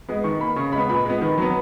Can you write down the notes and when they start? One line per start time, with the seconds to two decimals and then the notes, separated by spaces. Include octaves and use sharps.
0.09 G#3 B3
0.24 D#3 C#6
0.40 A#3 B5
0.56 C#3 C#6
0.72 G#3 B5
0.78 B3
0.89 A#2 B5
1.05 G#3 B3
1.21 D#3
1.38 F#3 B3